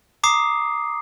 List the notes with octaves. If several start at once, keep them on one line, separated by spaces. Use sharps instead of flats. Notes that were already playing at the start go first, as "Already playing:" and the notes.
A#5 D6 D#6 C7